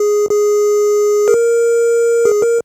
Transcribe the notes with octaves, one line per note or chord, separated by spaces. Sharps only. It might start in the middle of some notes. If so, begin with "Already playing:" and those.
Already playing: G#4
G#4
A#4
G#4
A#4